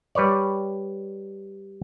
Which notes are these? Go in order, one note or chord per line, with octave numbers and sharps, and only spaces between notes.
G3 B4 C#5 D5